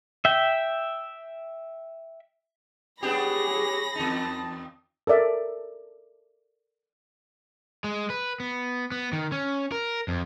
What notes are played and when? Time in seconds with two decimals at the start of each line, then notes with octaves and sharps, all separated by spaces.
0.25 E5 G5
3.03 B3 D4 G4 G#4 C#5 B5 A#6
3.95 E2 D#4 A5
5.07 A4 A#4 D5 E5
7.84 G#3
8.10 B4
8.40 B3
8.91 B3
9.13 D#3
9.32 C#4
9.72 A#4
10.08 F2